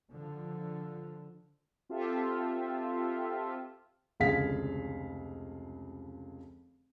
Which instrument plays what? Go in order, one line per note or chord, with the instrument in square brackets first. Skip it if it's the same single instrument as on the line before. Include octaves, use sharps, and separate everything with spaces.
[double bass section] D3 F3
[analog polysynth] C4 F4 G4 A4 E5
[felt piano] F1 C#2 D3 G#4 F5 B6